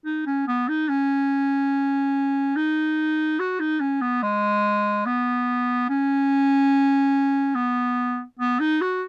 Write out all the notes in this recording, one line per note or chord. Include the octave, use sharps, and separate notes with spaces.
D#4
C#4
B3
D#4
C#4
D#4
F#4
D#4
C#4
B3
G#3
B3
C#4
B3
B3
D#4
F#4